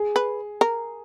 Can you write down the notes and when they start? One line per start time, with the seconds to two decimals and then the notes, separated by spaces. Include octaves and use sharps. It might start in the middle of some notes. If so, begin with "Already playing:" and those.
Already playing: G#4
0.16 B4
0.61 A#4